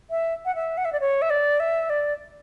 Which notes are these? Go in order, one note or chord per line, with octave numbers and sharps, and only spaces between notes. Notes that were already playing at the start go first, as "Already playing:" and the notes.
E5
F#5
E5
F#5
E5
D5
C#5
E5
D5
E5
D5